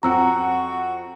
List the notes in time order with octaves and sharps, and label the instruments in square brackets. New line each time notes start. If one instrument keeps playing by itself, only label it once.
[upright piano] F2 C4 F#5 [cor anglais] F#4 [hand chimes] A#5 E6